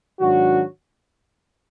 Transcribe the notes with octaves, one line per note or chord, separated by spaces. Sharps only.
G#2 D#3 F#3 D4 F#4